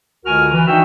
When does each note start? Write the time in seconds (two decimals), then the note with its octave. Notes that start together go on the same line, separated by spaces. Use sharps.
0.25 C#2 D3 F#4 A#4 G#5 F6
0.53 E3
0.67 D4 D#4 F#4 E5 G5